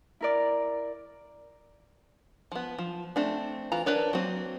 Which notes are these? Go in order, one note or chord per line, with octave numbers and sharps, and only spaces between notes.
E4 A#4 D5
F3 B3
F3
A3 C4 D4
E3 F4 A#5
D4 A#4 B4 C#5
F#3 A#3 C4